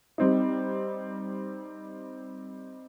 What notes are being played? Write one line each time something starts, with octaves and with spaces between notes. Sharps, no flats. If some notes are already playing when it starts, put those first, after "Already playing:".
G3 C4 D#4